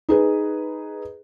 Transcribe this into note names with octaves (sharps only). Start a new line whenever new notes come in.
D#4 G#4 B4